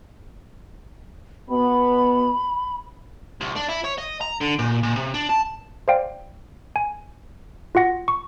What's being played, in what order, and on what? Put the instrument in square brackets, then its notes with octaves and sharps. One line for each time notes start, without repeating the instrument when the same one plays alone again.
[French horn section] B2 B3 [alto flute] B5
[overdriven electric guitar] C2
D4
E4
C#5
D#5
A#5
D3
A#2
A#2
C3
D4
A5
[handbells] C5 D5 F5 G5
G#5
F4 F#4 F#5 A#6
C#6